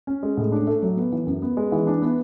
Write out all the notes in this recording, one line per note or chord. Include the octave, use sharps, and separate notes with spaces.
C#4
G#3
A2
D4
A3
F#3
B3
E3
F#2
B3
G#3
E3
D4
B3